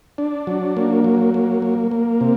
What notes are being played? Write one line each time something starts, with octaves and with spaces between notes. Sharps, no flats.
D4
F#3
A#3
F#3
A#3
A#3
A#3
C3